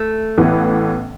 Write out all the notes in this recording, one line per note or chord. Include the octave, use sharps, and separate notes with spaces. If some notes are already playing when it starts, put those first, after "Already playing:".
Already playing: A3
A1 A2 E3 B3